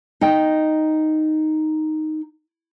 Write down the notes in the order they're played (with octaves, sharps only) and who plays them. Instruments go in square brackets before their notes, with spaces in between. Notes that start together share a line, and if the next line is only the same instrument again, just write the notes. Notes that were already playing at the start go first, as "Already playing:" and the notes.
[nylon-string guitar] D#4 D#5 G5